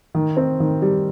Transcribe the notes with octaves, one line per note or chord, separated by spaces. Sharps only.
D#3
C4
D#3
G3